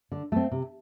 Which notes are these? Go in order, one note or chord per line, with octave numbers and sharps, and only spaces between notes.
D3
A3 C4
C3